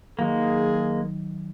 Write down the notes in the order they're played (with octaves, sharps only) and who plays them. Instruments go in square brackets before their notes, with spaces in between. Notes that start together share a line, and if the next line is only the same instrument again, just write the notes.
[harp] D#3 F#3 [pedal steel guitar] G#3 A#3 [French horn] G#4